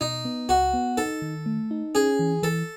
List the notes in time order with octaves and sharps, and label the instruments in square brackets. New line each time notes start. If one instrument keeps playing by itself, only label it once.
[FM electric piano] B2 [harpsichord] D#4
[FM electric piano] B3
[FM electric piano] C#2 [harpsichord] F#4
[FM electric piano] B3
[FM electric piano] D#4 [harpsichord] A4
[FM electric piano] D#3
A3
D#4
[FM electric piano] C#4 [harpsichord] G#4
[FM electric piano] E3
[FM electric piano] E3 [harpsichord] A4